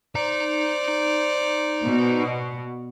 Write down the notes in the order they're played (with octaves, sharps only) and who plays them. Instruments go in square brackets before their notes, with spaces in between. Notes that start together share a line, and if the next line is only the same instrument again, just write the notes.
[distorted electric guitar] D#4 A#5 [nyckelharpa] C5 D5
[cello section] B2